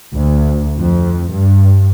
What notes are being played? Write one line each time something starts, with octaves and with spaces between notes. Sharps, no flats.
D2
F2
G2